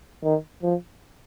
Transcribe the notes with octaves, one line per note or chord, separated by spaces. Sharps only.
D#3
F3